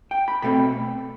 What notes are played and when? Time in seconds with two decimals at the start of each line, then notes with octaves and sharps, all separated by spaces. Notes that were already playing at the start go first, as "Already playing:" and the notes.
0.11 G5
0.28 B5
0.42 B2 A3 C4 B5